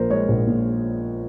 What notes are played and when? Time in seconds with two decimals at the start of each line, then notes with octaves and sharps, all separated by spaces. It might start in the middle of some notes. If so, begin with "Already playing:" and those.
Already playing: A#1 A#2 F3 A#4 C5
0.10 G#3 C#5
0.28 A#1
0.47 A#2